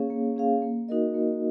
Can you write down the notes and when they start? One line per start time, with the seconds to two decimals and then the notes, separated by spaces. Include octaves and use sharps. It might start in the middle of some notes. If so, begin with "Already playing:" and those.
Already playing: A#3 C#4 G#4 C#5 F5
0.10 A#3
0.37 C#4 G#4 C#5 F5
0.62 A#3
0.89 D#4 F#4 A#4 D#5
1.14 A#3